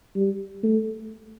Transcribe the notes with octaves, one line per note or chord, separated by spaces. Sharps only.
G3
A3